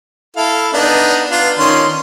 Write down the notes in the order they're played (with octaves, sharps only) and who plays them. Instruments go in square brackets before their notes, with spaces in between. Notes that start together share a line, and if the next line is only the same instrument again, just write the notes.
[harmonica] E4 A4 F5
B3 D4 D#4
B3 D4 F4
D#3 C#4 C6